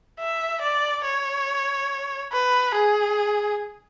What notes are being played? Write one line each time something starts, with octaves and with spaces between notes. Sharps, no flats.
E5
D5
C#5
B4
G#4